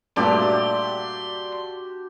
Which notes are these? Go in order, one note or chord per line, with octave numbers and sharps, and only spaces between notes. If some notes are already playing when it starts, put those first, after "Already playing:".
G2 A#2 A3 D4 F#4 G4 D5 C6